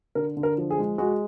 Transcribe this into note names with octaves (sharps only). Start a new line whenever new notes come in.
D3 A#4
D3
A#4
F3
G#4
G#3
G#3 F#4